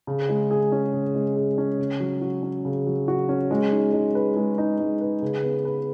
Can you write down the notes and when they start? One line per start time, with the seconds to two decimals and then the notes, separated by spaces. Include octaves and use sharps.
0.07 C#3
0.29 G#3
0.51 G#4
0.72 C#4
0.93 C#3
1.15 G#3
1.36 G#4
1.58 C#4
1.79 C#3
2.00 F#3
2.21 F#4
2.43 C#4
2.65 C#3
2.87 F#3
3.08 F#4
3.29 C#4
3.51 G#3
3.72 D#4
3.93 G#3
4.15 B4
4.36 G#3
4.58 D#4
4.79 G#3
5.01 B4
5.22 C#3
5.43 B3
5.65 B4